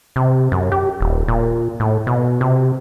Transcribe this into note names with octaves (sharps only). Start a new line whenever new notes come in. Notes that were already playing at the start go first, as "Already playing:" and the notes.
C3
F#2
G4
D#1
A#2
A2
B2
C3